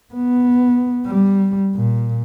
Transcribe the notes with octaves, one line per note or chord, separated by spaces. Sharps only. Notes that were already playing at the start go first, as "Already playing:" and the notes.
B3
G3
A#2